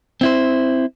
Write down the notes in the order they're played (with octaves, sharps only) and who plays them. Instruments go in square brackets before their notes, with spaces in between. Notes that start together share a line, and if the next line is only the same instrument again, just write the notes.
[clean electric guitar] C4 E4 C5